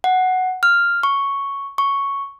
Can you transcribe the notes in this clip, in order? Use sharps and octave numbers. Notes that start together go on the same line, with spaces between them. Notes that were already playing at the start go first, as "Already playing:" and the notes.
F#5
F6
C#6
C#6